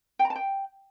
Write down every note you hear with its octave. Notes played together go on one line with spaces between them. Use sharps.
G5
A#5
A5
G5